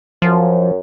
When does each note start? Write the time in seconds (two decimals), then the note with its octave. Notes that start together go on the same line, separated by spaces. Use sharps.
0.22 F#2 F3